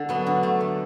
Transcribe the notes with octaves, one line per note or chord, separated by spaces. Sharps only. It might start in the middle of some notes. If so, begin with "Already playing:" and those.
Already playing: D3 A4
F#3 B3
D3
A3
A3